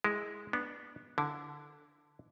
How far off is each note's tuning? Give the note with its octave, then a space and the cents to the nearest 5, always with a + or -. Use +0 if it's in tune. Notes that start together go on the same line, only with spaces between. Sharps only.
G#3 +0 E4 -5
B3 -15 D4 +0
D3 +0 E4 +0